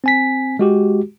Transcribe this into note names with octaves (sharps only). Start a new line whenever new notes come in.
C4 G#5 B6
G#3 F#4 G4